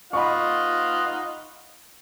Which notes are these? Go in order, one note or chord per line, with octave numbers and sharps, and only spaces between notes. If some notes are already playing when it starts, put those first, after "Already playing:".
D#4 F4 D#5 F#5 B5 C#6